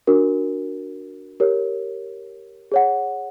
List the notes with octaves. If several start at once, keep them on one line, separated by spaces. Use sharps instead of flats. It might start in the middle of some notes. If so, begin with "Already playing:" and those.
D4 F#4 A#4
G4 A#4 C#5
G#4 C#5 F#5